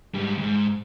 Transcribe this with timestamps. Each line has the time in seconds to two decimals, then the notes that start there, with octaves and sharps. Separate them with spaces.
0.14 G#2 G3
0.38 F2 G#2